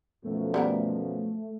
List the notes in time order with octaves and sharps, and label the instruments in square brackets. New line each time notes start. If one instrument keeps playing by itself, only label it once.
[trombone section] F#2 B2 F3 [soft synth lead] A3
[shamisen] G3 B3 A#4